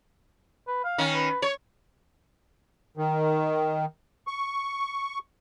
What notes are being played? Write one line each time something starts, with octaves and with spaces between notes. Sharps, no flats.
B4
F5
D#3 C#4
B4
C#5
D#3
C#6